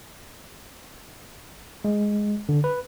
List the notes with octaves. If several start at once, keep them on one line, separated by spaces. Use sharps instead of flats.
G#3
D3
B4